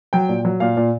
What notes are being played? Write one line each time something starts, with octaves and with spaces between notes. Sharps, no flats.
F#3 G5
A#2
F#3
A#2 F5
A#2